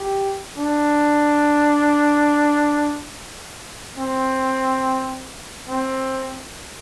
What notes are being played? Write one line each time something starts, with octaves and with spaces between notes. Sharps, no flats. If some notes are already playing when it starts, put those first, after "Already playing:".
Already playing: G4
D4
C4
C4